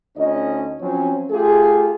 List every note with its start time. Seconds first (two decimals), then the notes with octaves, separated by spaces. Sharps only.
0.18 D2 C#4 D#4 D#5
0.81 F3 F#3 C4 C#4
1.31 A3 F4 G4 G#4